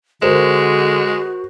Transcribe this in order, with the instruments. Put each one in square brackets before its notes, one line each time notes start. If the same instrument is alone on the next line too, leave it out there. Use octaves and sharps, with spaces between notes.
[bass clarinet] D3 [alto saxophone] G#3 [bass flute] F#4 [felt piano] A#4 C5 E7